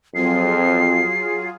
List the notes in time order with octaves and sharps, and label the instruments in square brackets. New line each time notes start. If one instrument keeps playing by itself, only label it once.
[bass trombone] F2 [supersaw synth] F#3 F4 G#4 [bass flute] C4 [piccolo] C7